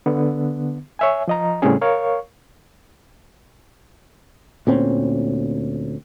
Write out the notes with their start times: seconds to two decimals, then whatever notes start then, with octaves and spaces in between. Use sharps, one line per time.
0.06 D3 B3
0.99 C#5 E5 G#5
1.28 F3 D#5 A#5
1.62 A2 C#3 G3 C4 C#4 G#4
1.81 A#4 C#5 F5 C#6
4.67 D2 A#2 C4 C#4